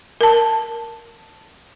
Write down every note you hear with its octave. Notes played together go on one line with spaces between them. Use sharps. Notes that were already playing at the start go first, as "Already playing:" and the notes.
A#4 A5